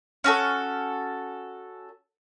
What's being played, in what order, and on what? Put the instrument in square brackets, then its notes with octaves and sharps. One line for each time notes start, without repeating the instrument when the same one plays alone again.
[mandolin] C#4 F#4 A4